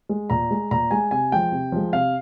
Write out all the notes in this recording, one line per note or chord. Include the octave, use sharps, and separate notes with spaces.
G#3
A#2 A#5
G#3
A#2 A#5
G#3 G#5
C3 G#5
F3 G#3 G5
C3
F3 G#3
C3 F5